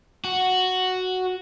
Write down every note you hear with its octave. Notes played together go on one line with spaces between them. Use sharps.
F#4